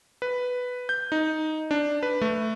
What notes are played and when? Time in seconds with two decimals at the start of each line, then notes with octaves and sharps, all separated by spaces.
0.22 B4
0.89 G6
1.12 D#4
1.71 D4
2.03 B4
2.21 A3